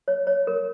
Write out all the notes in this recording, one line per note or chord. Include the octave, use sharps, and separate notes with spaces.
C#5
C#5
A#4